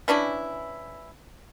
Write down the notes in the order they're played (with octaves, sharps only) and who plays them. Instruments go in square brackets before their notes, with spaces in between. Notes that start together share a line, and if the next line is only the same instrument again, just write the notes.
[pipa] E3 C#4 D4 E4